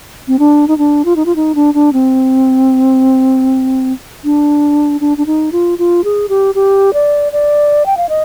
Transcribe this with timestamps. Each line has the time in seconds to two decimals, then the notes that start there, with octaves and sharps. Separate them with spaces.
0.28 C4
0.39 D4
0.68 D#4
0.78 D4
1.05 F4
1.16 D#4
1.26 F4
1.36 D#4
1.55 D4
1.74 D4
1.93 C4
4.24 D4
5.01 D4
5.18 D4
5.26 D#4
5.52 F4
5.79 F4
6.04 G#4
6.29 G4
6.55 G4
6.94 D5
7.32 D5
7.86 G5
7.97 F5
8.09 D#5